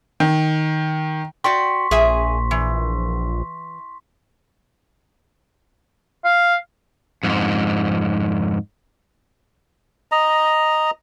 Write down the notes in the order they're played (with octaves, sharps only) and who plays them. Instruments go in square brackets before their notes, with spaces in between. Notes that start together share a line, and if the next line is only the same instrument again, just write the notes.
[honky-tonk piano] D#3
[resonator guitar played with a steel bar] F#4 D5 G5 [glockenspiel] C6 C#6 B6
[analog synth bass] A#1 [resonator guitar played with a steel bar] G#4 E5 G#5
[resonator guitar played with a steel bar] E3
[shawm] F5
[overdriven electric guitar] F2 G#2
[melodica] D#5 A#5